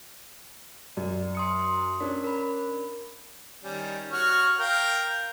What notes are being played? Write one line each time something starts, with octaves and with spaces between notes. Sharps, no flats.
F#2 D5
C6 D#6 C#7
C#4 D4 A#4
A#4 B5
D#3 G3 C#4
F#4 C#5 F6
A#4 F5 G5